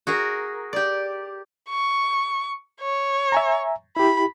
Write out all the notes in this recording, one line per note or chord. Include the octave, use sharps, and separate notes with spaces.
F#4 G#4 A#4
G4 D5
C#6
C#5
E5 G#5 A#5
E4 G4 B5